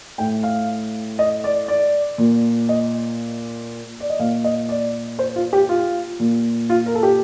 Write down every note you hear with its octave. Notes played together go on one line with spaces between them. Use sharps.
A2 G5
F5
D#5
D5
D5
A#2
D#5
D5
D#5
A#2 F5
D#5
D5
C5
F4
G4
F4
A#2
F4
A#4
A4
G4